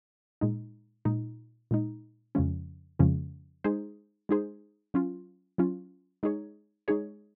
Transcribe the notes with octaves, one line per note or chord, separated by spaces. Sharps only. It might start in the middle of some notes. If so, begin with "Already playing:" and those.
A#2 G#3 D#4
A#2 G#3 D#4
A#2 G#3 D#4
F2 C#3 F3 G#3 C#4
F2 C#3 F3 G#3 C#4
G#3 D#4 G#4 C5
G#3 D#4 G#4 C5
F#3 C#4 F4
F#3 C#4 F4
G#3 D#4 G#4 C#5
G#3 D#4 G#4 C#5